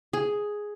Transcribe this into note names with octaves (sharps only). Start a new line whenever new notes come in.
G#4